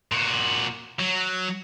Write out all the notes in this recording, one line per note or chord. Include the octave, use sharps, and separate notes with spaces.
A#2 F#4
F#3